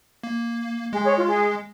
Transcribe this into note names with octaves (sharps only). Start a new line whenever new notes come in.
A#3
G#3 G#4
G#4 C#5
F4
G#4